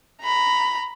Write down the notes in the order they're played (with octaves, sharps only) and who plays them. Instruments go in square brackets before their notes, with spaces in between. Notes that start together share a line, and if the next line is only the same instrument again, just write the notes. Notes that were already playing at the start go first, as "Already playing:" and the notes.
[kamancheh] A#5 B5